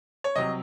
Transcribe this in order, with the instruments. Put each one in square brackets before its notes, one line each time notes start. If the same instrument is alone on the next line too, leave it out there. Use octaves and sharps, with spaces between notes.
[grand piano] C#5
C2 C3 F#3 D#5